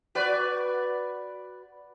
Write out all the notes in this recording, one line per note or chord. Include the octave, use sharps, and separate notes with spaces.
F#4 B4 D5